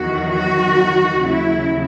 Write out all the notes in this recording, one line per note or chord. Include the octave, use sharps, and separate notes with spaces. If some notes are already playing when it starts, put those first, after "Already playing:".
Already playing: E2 D#3 F#3 F#4
F#4
D#2 C#3 F#3 E4